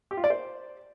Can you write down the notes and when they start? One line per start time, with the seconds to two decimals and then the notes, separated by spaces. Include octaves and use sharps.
0.11 G4
0.17 F4
0.24 D5
0.30 C5